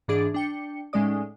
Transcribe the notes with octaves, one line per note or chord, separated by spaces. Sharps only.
G#2 E3 D4 G#4 A6 D7
D4 G5 C#7
A2 G#3 C#4 D#4 D5 D#6